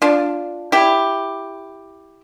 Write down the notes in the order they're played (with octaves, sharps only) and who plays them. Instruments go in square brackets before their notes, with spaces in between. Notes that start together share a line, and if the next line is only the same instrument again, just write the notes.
[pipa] D4 F4
E4 G4